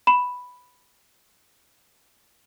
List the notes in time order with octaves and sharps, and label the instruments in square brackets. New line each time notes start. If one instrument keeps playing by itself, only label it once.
[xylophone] B5 E7